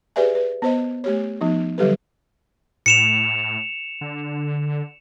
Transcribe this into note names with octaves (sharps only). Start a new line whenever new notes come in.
G4 G#4 B4 D5 E5 G#5
B4
B3 C5 D#5
A3 G4 C#5
F3 B3 D#4
D3 F#3 G3 G4 A4 B4
A2 C#7 E7 F7
D3